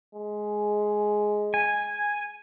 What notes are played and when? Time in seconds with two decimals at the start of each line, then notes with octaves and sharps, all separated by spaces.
0.15 G#3
1.54 G#5